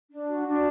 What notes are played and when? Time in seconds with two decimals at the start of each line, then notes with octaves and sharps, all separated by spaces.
0.10 D4
0.29 F#4
0.47 D4